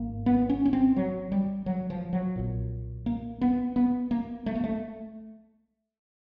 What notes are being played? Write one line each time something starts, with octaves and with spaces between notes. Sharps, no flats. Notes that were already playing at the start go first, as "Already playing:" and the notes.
Already playing: G#1 G#2 A#3
B3
C#4
C#4
C4
F#3
G3
F#3
F3
F#3
B1 A#2
A#3
B3
B3
A#3
A3
A#3
A3